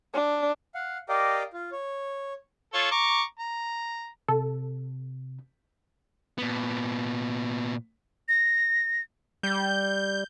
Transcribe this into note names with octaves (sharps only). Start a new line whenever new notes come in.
D4
F5 F#5
G4 A#4 D5 D#5 F5 G5
F4
C#5
F4 A4 C#5
A#5 C#6 D6
A#5
C3 A4
A#2 B3
A#6
G3 G6